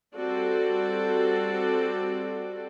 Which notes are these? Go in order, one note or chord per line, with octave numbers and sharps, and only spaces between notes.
G3 C4 F#4 A4 D5